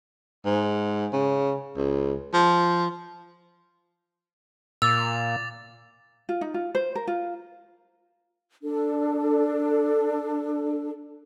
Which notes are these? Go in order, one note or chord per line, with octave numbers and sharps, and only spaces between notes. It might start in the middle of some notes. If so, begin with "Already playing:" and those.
G#2
C#3
C#2
F3
A#2 D6 E6 A6 F7
F4
D#4
F4
C5
A#4
F4
D4 A4